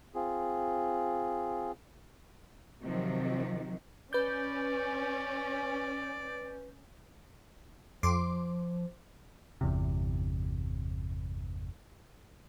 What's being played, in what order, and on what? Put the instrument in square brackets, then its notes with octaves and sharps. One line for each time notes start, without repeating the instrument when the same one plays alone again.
[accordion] C4 F4 G#4
[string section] C3 D#3 F3 F#3
[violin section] C#4 [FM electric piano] B4 G6 [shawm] D5
[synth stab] F2 C6 D6 [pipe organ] F3
[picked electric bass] G1 E2 C3